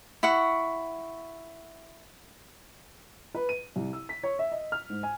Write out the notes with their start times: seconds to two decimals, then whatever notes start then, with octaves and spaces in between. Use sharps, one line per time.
0.23 E4 F#5 C#6
3.35 B4
3.49 D#7
3.76 C2
3.93 E6
4.09 B6
4.23 C#5
4.39 E5
4.52 D#5
4.72 F6
4.90 G#2
5.03 G#5